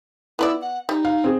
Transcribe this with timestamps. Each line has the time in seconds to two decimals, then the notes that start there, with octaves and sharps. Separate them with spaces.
0.39 B3 E4 B4 D5
0.61 F#5
0.89 G3 D#4
1.05 F5
1.24 C4 G#4